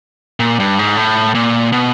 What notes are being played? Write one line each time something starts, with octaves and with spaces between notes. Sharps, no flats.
A#2
G2
G#2
A2
A#2
B2